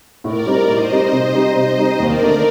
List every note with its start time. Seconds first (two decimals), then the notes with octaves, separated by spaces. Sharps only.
0.24 A2 A#4 D5
0.46 G3 C4 D#4
0.68 A2 C5 D#5
0.90 G3 C4 D#4
1.12 C3
1.34 G3 C4 D#4
1.55 C3 C5 D#5
1.77 G3 C4 D#4
1.99 D#2 A#4 D5
2.21 D3 A3 D#4